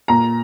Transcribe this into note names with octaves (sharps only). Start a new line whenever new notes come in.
A#2 A#5